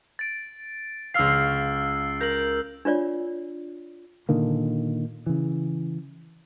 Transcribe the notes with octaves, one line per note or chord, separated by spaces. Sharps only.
A6 D7
C#2 F5 E6 F6 C7
A#4 G6 F#7
D4 F4 C#5 D5
A#2 D3 D#3 A#3
C#3 E3